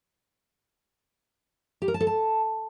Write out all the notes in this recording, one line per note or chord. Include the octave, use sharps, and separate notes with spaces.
G4
A#4
A5
A4
A5